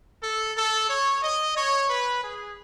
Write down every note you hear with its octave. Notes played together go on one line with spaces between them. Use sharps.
A4
A4
C#5
D#5
C#5
B4
G#4